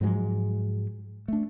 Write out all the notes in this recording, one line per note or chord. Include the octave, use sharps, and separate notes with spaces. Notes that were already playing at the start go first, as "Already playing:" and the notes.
G#2 F3 F#3 G#3
A3 D4